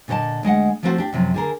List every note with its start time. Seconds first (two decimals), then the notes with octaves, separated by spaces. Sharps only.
0.08 A#2 D3 C#5 D#5 A5
0.43 D2 G#3 D#5 F#5
0.83 F3 A3 C4 F#4 A4 C5
0.98 D4 G4
1.13 F#2 C3 F3
1.34 D3 G#4 A#4